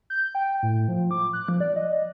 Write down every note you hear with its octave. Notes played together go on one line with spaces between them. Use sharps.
G6
G5
A2
F3
D6
F#6
F3
D5
D#5